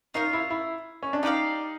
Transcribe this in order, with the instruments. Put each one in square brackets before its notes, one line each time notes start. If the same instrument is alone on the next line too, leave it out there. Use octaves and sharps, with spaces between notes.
[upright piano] D#4 [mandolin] F4 A#4 C#5 F5
[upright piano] E4
E4
C#4
D4
[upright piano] D#4 [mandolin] G4 B4 D5 F5